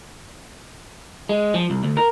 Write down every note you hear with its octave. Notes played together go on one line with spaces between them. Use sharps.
G#3
F3
C2
D2
A#4